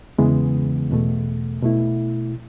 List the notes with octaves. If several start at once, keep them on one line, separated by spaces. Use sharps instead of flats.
E2 C#3 E3 G#3 B3
E2 B2 A3
B2 A3 E4